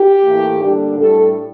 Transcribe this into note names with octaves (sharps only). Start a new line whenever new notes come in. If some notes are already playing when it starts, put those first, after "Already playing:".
Already playing: G4
A2 E3 A#3
D3 G3 A#3 D4
A2 G3 D4 A4